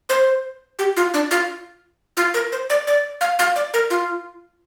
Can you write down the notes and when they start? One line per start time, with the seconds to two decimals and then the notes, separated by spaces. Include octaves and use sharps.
0.09 C5
0.79 G4
0.97 F4
1.14 D4
1.31 F4
2.17 F4
2.34 A#4
2.52 C5
2.70 D5
2.87 D5
3.21 F5
3.39 F5
3.56 D5
3.74 A#4
3.90 F4